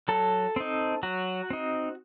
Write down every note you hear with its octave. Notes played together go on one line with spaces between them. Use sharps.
F#3 A4
C4 D#4
F#3 F#4
C4 D#4